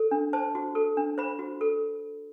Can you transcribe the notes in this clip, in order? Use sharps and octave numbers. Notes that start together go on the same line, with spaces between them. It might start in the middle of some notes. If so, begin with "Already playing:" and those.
Already playing: A4
D4
C5 A5
F#4
A4
D4
C5 B5
F#4
A4